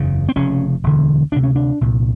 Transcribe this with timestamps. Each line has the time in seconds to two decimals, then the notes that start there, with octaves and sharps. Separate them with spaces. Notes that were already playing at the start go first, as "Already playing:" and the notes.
Already playing: F#1 E2 C#3
0.29 C4
0.36 F1 F2 C#3 C#4
0.83 E1 D2 D3
1.32 D2 C3 D4
1.44 C#4
1.56 D4
1.81 C2 A#2